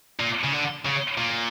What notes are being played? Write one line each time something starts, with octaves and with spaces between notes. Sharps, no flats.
A#2
C#3
D3
C#3
A#2